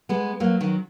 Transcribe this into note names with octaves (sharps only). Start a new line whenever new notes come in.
G#3 B3
F#3 A#3
D#3 F#3